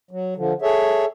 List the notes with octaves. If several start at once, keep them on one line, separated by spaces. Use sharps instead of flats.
F#3
D3 F3
G#4 A4 C#5 E5